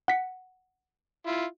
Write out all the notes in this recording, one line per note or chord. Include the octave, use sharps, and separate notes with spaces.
F#5 B6 C#7
E4 F4